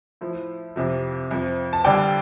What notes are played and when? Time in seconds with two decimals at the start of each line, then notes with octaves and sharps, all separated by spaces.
0.21 A2 F3
0.76 F2 C3 F3
1.31 F2 F3
1.73 A5
1.85 G2 D3 G3 D5 G5